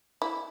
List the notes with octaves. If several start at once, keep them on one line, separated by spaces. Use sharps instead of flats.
E4